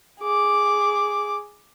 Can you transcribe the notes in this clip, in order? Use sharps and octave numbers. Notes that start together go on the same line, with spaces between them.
G#4 D6